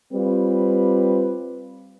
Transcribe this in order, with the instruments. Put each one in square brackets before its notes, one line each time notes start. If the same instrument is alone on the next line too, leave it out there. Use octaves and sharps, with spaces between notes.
[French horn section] G3 C4 F4 B4